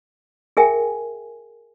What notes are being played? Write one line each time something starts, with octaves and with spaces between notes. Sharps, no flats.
G#4 A#4 E5 G5 G#5